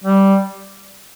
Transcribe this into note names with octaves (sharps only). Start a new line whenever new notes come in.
G3